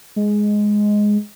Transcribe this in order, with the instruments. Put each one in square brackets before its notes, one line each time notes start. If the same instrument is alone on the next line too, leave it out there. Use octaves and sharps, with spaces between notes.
[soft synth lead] G#3